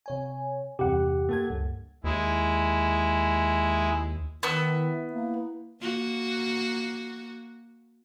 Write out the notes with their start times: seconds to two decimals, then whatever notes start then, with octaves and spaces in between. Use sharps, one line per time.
0.06 C3 C#5 G#5
0.79 E2 G2 C3 G4 F#5
1.29 A#3 A4 G#6
1.50 C#2 G2
2.04 D#2 G#3 E4
4.43 D#3 B3 E4 E6
5.13 A#3
5.81 A#3 F#4